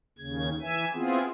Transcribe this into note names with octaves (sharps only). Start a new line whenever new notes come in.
D#2 C#3 G#6
E3 E5 G#5
B3 C4 E4 F4 G#4